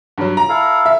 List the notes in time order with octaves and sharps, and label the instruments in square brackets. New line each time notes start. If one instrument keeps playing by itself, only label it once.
[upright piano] G2 F#3
A#5
[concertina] E4 A4 F5
[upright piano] E5